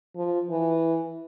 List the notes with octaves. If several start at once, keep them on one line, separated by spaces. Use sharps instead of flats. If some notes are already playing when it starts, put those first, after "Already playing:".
F3
E3